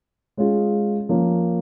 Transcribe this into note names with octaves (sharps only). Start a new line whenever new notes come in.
G#3 C#4 F4 G#4
F3 A#3 C#4